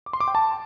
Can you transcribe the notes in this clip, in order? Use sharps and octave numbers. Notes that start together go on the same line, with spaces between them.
D6
C6
D6
G5
A5